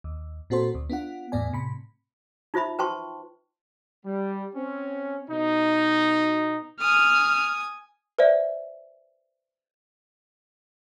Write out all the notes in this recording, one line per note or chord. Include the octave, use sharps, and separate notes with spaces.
D#2
A#2 C4 F#4 A4 C5 C6
D2
B3 D4 F4 F#5
E2 A2 B3 D5 G#5
A2 C3 B5
D#4 F4 C5 E5 B5
B4 C5 G5 A5 C6 C#6
G3
C4 C#4
B2 D#4
G#5 D#6 F6
B4 C5 D5 E5